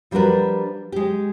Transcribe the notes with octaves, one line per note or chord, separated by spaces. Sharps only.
F3 G3 D4 F#4 A#4 B4
G#3 G4